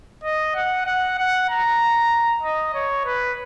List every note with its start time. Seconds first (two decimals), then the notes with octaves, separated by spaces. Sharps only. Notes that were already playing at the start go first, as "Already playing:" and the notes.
0.24 D#5
0.55 F#5
0.86 F#5
1.18 F#5
1.49 A#5
2.43 D#5
2.74 C#5
3.05 B4